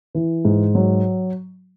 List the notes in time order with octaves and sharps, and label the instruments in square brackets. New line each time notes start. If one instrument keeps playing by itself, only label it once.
[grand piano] E3
G#2
F#3